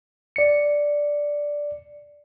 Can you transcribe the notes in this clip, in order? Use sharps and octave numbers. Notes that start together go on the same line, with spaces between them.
D5 C#7